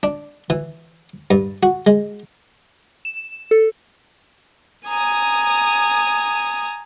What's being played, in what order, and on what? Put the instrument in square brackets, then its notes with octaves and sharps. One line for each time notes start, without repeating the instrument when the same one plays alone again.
[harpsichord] D4
E3
G2
F#4
G#3
[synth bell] E7
A4
[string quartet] G#5 A#5 D#6